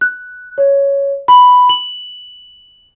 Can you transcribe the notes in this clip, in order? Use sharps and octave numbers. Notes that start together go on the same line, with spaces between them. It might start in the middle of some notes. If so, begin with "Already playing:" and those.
F#6
C#5
B5
F#7